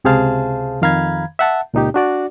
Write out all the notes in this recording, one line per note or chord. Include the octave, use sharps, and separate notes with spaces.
C#2 C3 G#4 C5 F5 A5
F2 D#3 F5 A#5 B5 G#6
E5 F#5 A5
C#2 A#2 D#4 G4
D4 F#4 D5